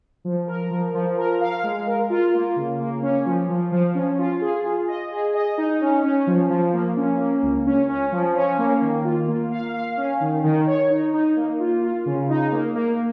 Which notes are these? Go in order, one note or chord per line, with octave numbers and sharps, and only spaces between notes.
F3
A#4
F3
F3
A#4
F5
G#3
A#4
F4
A#3
C#3
A#3
C#4
F3
F3
F3
C#4
F4
G#4
F4
D#5
G#4
D#5
D#4
C#4
C#4
F3
F3
A#3
C#4
A#3
C#2
C#4
C#4
F3
C#4
A#3
D#3
F4
A#3
F5
F5
C#4
D#3
D#3
C#5
D#4
D#4
A#3
F4
F4
C#3
D#4
A#3
A#3